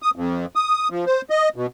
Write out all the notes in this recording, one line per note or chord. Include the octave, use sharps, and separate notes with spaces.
D#6
F2
D#6
F3
C5
D#5
B2